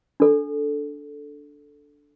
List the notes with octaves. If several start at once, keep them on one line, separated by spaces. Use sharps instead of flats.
D4 A4